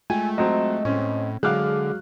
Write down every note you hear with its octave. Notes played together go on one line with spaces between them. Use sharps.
G#3 A3 F4 G5 G#5
F#3 C4 D#5
A2 C4 C#4
D3 F#3 G#3 G#4 F5 D6 F6 F#6